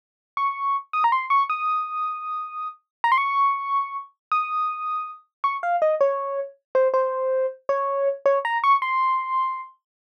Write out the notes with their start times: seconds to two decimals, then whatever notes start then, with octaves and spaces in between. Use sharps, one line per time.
0.37 C#6
0.93 D#6
1.04 A#5
1.12 C6
1.30 C#6
1.50 D#6
3.04 A#5
3.12 C6
3.18 C#6
4.32 D#6
5.44 C#6
5.63 F5
5.82 D#5
6.01 C#5
6.75 C5
6.94 C5
7.69 C#5
8.26 C#5
8.45 A#5
8.64 C#6
8.82 C6